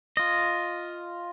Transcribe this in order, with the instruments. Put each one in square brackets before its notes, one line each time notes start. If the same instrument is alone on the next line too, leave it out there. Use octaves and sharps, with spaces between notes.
[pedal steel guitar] F4 D#5